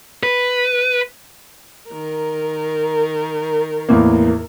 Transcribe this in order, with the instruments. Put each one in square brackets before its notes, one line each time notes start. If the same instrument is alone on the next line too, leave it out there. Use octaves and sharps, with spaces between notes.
[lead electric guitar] B4
[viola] D#3 A#4
[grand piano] E2 A2 A#3